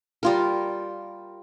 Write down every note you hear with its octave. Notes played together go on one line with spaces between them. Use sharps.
G3 F4 A#4